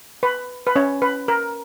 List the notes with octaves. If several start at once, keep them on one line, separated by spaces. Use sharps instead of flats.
B4
B4
C#4 C#5
B4
A#4